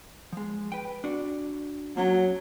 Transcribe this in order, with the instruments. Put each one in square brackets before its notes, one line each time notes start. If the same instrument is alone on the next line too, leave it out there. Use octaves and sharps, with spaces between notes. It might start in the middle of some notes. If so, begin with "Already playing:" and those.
[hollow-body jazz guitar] F3 G#3
B4 G5
D4 F#4
[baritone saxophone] F#3 [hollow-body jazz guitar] A#3 C#4